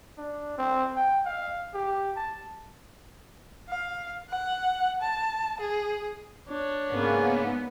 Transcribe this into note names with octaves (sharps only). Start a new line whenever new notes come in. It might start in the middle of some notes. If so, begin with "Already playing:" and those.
D4
C4
G5
F5
G4
A5
F5
F#5
A5
G#4
D4 C#5
G#2 C#3 A#3 B3 C#4